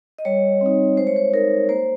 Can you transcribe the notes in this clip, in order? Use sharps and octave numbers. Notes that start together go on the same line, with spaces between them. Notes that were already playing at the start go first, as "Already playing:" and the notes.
D#5
G3 C#5
C4 D#4
G#3 C5
C#5
C5
D#4 A#4
A#3 C5